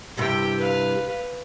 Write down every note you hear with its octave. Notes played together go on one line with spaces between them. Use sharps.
G2 C3 E4 G4 G5
B4 F5